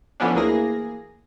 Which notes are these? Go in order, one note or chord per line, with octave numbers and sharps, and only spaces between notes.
D3 E3 F3 B3 C#4 D4
D2 E3 A#3 G#4 A#6